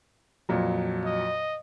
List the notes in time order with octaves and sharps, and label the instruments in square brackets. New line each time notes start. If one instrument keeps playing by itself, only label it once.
[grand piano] F2 A#2 F#3
[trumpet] D#5